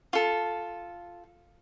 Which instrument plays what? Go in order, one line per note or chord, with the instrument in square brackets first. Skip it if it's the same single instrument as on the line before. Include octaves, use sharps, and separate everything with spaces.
[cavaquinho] F4 A4